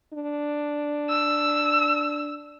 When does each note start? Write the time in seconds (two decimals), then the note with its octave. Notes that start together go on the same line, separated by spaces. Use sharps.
0.13 D4
1.09 E6